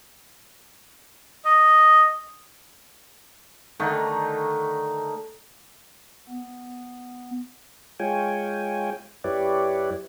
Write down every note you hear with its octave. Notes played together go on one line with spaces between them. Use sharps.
D#5
D3 D#3 A3 D#4
B3
G#3 F4 C#5 G5 G#5
F#2 E4 G4 B4 C#5 D5